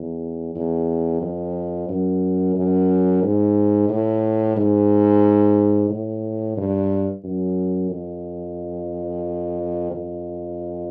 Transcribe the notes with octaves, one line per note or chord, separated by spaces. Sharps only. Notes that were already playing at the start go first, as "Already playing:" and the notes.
Already playing: E2
E2
F2
F#2
F#2
G#2
A2
G#2
A2
G2
F#2
F2
F2